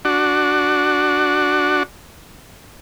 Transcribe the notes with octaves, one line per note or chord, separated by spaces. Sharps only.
D4 F#4